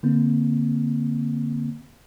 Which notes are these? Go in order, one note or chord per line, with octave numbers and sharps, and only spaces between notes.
D3 A#3 C4